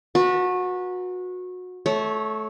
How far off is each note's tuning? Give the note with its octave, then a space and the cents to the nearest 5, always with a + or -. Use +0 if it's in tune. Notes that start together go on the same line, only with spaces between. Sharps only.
F#4 -25 B4 -25 A5 +25
A3 -20 C#5 +0